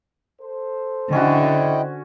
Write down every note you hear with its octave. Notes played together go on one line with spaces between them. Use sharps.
A4 C5
D3 C#4 E4 F#4 D#5 G5